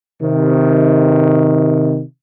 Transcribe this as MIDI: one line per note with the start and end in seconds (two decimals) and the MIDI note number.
0.22 2.03 48
0.22 2.03 51